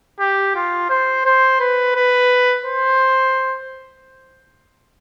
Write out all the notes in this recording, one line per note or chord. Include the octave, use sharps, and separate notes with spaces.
G4
F4
C5
C5
B4
B4
C5